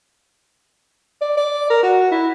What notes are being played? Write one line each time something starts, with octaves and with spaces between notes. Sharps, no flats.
D5
D5
A#4
F#4
E4